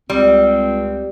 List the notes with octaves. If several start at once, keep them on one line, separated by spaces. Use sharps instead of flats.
C#2 G3 C4